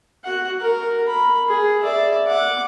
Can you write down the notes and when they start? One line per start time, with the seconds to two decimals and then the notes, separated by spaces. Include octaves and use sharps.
0.25 F#4 F#5
0.60 A#4
1.08 B5
1.48 G#4
1.82 D5 E5
2.28 F#5 D6